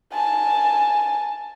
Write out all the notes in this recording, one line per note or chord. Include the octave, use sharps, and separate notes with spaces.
G#5 A5